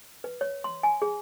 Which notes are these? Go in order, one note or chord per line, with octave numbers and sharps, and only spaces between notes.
B4
C#5
C6
G#5
G#4